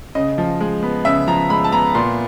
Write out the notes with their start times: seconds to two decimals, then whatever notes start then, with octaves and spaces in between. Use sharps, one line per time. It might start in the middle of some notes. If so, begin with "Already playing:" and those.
0.15 C#3 D#5
0.38 F3
0.60 G#3
0.83 B3
1.05 C#3 E5
1.27 F3 A#5
1.50 G#3 B5
1.64 A5
1.72 B3 A#5
1.95 A#2 C6